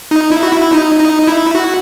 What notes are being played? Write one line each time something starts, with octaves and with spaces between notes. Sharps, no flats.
D#4
E4
F#4
E4
D#4
D#4
E4
F#4